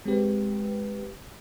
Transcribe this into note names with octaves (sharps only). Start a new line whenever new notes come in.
G#3 C4 G4 B4